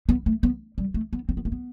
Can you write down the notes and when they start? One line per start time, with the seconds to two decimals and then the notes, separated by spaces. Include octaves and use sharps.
0.09 B3
0.26 A3
0.43 B3
0.78 G3
0.94 A3
1.13 B3
1.29 C4
1.37 B3
1.45 A3
1.52 B3